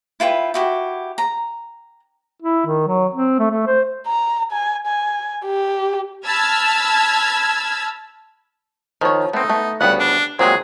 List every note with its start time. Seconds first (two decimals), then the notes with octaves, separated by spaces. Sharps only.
0.20 E4 F4 B4 G5
0.54 E4 F#4 G4
1.18 A#5
2.42 E4
2.66 D#3
2.87 F#3
3.14 C4
3.39 A3
3.51 A3
3.67 C5
4.07 A#5
4.52 G#5
4.87 G#5
5.45 G4
6.26 A5 B5 E6 F6 G#6
9.01 D#3 F3 C#5
9.33 A3 B3 C4 D#4
9.49 A3 B3
9.81 D2 C#3 G3 B3 F5 F#5
10.00 D4
10.39 A#2 F#3 G#3 C4 G4 G#4